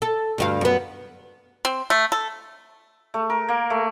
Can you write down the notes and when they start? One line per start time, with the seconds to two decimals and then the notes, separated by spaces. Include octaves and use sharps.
0.02 A4
0.38 D2 G2 F5
0.61 F#2 B3
1.65 C4
1.90 A3
2.12 A4
3.14 A3
3.30 A#4
3.49 A#3
3.70 A3